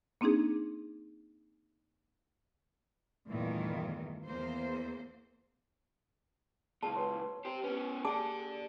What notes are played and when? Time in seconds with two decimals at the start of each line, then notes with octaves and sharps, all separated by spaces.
0.21 A#3 C4 D4 D#4 G#4
3.30 E2 G2 A#2 D#3 E3 A3
4.25 E2 A#3 C5
6.83 C#2 A#2 G#4 A5
6.96 B4 C#5 C6
7.45 G4 C5
7.64 B3 C#4 B4
8.05 A#3 G4 G#4 D5 F#5 G#5 A5 D6